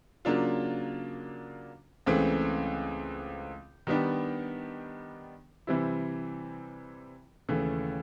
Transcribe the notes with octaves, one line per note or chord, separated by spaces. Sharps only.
C#3 F#3 A#3 D4 F4
C#2 C#3 E3 A3 C4
D#3 G3 B3 D4 G4
C3 E3 G3 C4 E4
D#2 C#3 E3 A3